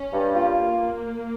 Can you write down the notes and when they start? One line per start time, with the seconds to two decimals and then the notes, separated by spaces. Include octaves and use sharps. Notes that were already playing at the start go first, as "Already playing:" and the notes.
Already playing: C#4
0.12 G2
0.36 A#3 F4